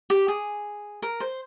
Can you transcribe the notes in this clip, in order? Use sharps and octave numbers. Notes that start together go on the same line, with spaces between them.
G4
G#4
A#4
C5